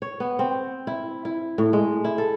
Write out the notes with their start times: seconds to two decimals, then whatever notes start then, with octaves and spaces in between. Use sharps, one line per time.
0.02 C#5
0.20 B3
0.39 C4
0.87 E4
1.25 E4
1.58 A2
1.73 G#3
2.04 E4
2.18 A4